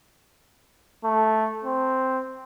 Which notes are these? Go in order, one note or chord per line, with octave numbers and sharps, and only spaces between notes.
A3
C4